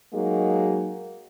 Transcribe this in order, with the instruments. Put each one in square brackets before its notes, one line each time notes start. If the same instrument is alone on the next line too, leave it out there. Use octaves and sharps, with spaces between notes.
[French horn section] F#3 G#3 A#3 D#4 F#4